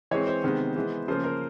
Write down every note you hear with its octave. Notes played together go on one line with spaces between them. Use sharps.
E3 G#3 C4 C#5
C5
C3 D#3 G#3 B3
E3 G#3 B3
C#3 F3 A#3 C#4 C5
A#4